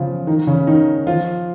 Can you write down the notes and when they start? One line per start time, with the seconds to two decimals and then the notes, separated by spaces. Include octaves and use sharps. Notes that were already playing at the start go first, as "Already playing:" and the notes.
Already playing: C#3 F3 C#4 F4
0.27 D#3 D#4
0.47 C#3 C#4
0.67 D#3 D#4
1.07 F3 F4